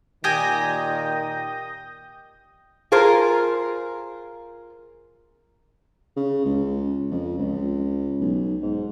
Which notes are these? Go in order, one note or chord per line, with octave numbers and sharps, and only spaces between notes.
A#2 D#3 G4 G#5 D#6 G6 A#6
F4 G#4 A#4 C5
C#3
C#2
F2
C#2
B1
G#2